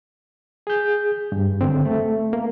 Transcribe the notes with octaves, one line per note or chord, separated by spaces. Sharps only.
G#4 G6
G2
D3 C4
A3
A#3